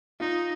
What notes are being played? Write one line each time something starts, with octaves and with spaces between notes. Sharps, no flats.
D#4 F4